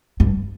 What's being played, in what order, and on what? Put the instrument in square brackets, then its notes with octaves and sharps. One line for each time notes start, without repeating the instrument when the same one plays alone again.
[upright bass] G2